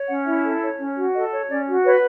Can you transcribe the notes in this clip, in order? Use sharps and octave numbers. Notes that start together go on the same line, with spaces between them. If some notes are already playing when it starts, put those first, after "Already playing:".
Already playing: C#5
C#4 F#5
E4 E5
A4
C#5
C#4
F#4
A4 D#5
C#5
C#4 D5
F#4
B4 C#5